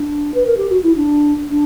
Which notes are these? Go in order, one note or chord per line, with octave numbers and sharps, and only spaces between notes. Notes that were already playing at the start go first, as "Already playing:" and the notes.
Already playing: D4
B4
A#4
G4
F#4
E4
D4
D4